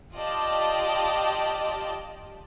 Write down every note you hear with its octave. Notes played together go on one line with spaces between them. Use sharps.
F4 G4 D5 D#5 G5 A5